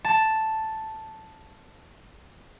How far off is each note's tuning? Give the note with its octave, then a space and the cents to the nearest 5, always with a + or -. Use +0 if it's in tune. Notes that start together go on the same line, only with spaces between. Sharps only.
A5 +0